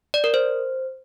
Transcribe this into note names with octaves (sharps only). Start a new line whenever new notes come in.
D5
A#4
C5